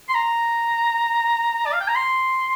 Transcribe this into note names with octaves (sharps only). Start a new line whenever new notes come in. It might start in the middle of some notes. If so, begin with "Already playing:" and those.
C6
A#5
D5
F5
G5
A#5
C6